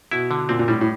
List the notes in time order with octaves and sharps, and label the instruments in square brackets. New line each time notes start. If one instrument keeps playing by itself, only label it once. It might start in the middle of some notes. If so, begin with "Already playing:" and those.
[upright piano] B2 [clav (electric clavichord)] E4
[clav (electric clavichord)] D3
[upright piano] A#2 [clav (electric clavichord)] C4
[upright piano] A#2
[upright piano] A2 [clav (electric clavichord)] G3
[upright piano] A2